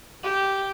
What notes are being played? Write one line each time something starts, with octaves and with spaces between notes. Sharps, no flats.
G4